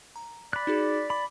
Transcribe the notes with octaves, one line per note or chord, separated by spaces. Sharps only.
A#5
D5 B5 F#6
D#4 F#4 G#4
B5 D6